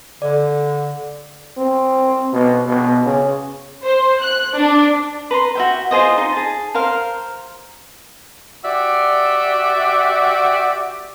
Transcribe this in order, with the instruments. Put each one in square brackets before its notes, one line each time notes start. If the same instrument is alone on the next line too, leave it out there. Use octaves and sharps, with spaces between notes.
[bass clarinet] D3 [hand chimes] D5
[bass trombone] C4
B2
B2
C#3
[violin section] C5
F#6
D4
[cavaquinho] B4 A#5 C6
F#4 E5 G5
F4 G#4 C5 D#5
D#4
G#4 A5
A#4 C5 F5
[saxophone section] F#4 G4 D5 E5